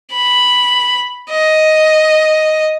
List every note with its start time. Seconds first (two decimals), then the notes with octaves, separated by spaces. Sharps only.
0.13 B5
1.31 D#5